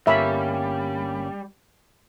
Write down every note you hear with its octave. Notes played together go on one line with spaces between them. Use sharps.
G1 G3 A#3 C#4 E5 B5